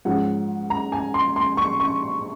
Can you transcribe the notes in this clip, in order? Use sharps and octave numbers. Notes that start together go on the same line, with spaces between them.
G#2 F3 G#3 C#4 F#5
A#5
G#5
C6
C6
C#6
C#6